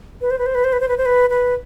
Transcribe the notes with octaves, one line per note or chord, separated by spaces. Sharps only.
B4
C5
B4
C5
B4
C5
B4
C5
B4
C5
B4
B4